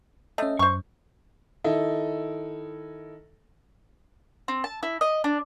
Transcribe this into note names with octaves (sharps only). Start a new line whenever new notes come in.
A3 C#4 D#5
F#2 C5 C#6
D#3 E4 A4 D#5
C4
A5
E4
D#5
D4